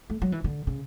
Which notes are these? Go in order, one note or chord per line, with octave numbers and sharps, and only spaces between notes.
A3
F#3
E3
D3
C#3